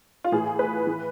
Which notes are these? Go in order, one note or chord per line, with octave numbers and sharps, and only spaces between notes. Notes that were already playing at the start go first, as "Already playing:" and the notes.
F4
A2 E3 G#4
B4
E3